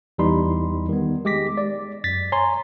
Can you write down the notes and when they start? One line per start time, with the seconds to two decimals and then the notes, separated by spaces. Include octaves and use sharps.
0.18 E2 E3 G3 D#4 B5 C6
0.89 D#3 B3
1.25 G#3 G4 D6 A#6 B6
1.57 D5
2.04 F#2 A6 B6
2.32 C#5 G#5 A#5 C6